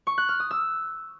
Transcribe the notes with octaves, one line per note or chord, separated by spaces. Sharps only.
C#6
F#6
F6
D#6
E6